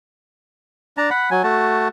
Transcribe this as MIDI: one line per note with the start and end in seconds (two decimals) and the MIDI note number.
0.97 1.10 62
0.97 1.10 81
0.97 1.10 82
1.10 1.30 78
1.10 1.30 83
1.31 1.43 54
1.31 1.43 80
1.43 1.88 57
1.43 1.88 66
1.43 1.88 81